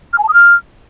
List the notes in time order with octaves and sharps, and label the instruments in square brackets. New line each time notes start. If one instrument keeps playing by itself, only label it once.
[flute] F6
G#5
A5
D#6
F6